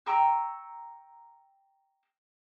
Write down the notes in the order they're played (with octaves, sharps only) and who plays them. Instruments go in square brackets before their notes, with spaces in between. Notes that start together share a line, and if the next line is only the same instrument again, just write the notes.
[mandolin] G5 A#5 C#6 E6